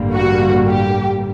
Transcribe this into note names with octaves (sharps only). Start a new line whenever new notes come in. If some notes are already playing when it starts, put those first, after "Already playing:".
Already playing: A1 G2 D3 G3 A#3
F#4
G4